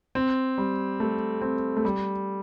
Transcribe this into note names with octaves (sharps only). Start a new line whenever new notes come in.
C4
G3
A3
C4
A3
G3